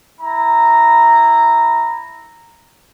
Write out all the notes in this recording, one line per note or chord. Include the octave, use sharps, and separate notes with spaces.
E4 A#5